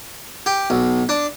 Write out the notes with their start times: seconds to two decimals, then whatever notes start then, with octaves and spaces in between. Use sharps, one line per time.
0.46 G4
0.70 B1
1.09 D4